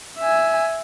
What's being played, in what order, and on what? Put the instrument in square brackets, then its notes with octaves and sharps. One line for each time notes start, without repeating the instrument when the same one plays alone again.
[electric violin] E5 G#5